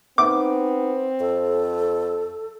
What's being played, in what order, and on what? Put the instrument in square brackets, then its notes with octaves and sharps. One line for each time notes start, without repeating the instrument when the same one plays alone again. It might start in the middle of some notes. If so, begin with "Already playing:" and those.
[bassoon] B3 [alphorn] C4 [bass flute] D#4 [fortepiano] D6
[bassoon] F2 [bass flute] A4